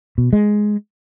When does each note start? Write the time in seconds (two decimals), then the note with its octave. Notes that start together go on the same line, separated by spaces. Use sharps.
0.18 B2
0.33 G#3